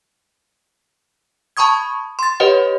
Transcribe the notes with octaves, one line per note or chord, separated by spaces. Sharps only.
A5 B5 C#6 D#6 G#6
C6 A6
G4 B4 C#5 D#5 F#5